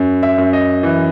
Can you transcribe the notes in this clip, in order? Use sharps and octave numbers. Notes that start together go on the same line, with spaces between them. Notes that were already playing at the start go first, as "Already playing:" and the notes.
Already playing: F#2
E5
F#2
D#5
E3